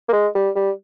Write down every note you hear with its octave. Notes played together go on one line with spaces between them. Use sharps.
A#3
G#3
G3
G3